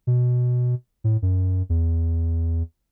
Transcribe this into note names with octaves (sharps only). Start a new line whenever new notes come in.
B2
A2
F#2
E2